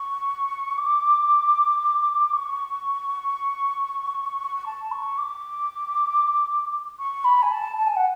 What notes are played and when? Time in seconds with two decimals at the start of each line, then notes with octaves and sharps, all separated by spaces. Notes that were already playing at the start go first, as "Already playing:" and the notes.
Already playing: C#6
0.77 D6
2.32 C#6
4.66 A5
4.91 C#6
5.18 D6
6.99 C#6
7.24 B5
7.42 G#5
7.51 A5
7.76 A5
7.86 G#5
7.96 F#5